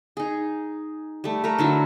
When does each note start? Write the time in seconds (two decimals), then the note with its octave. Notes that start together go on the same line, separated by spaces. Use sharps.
0.17 D#4 G#4
1.24 G3 A3
1.44 A3 A#4 A#5
1.59 D3 F#3 E4